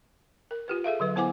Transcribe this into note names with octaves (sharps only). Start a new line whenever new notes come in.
A#4
F4 G4 B4
G#4 A4 E5 F5
D3 F#3 B4
B3 E4 C5 F#5 G#5 D6